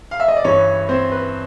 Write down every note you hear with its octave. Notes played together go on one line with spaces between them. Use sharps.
F5
E5
D#5
D5
G2 E3 C#4 C#5
C4 C5
B4